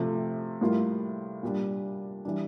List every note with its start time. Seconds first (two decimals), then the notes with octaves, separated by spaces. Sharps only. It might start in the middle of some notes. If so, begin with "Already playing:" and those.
Already playing: C3 F3 A3
0.61 A2 G3 A#3 F4
1.43 A#2 G3 D4
2.25 E3 G3 D4